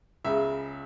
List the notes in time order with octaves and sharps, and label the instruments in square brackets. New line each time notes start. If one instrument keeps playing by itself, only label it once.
[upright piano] C#2 C#3 G#3 E5